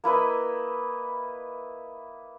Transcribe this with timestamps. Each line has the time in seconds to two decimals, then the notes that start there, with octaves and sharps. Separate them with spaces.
0.04 A#3 E4 B4 D#5